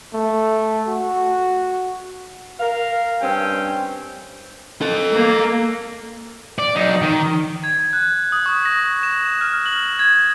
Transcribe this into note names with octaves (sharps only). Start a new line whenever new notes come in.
A3
F#4
A#4 F5
G2 C4 C#4 G5
A4 D#5
A#3
D5
F#3 D#4
D#3
G#6
F#6
D#6
C#6
A#6
E7
F6
F#7
G#6